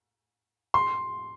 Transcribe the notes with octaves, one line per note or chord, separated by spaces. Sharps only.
C6